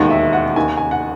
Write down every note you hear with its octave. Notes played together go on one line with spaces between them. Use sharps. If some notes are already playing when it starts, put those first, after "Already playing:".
Already playing: E1 D#2 D#3 F#5
E5
F#5
D#2 D#3 G#5
G#5
F#5